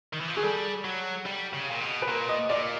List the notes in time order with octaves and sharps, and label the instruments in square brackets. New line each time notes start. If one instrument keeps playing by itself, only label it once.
[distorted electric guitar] D#3
E3
F3
[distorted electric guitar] F#3 [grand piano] G#4
[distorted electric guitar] G3 [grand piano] A4
[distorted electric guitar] F#3
G3
C#3
A#2
B2
[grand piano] B4
[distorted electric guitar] A#2 [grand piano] A#4
[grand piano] D#5
[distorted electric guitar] A#2 [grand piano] D5